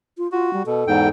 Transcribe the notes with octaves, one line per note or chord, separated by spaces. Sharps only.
F4
F4 F#4
G3
B2 A4
E2 G#2 G5